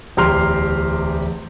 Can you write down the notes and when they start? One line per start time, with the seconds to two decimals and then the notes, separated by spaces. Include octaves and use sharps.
0.17 D1 E2 G4 A#5 C6 F6